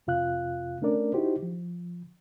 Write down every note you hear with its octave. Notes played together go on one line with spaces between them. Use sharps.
F2 C3 F4 F5 F#6
A3 C#4 D4 A#4 D5
D#4 E4 F#4 G4 C5
F3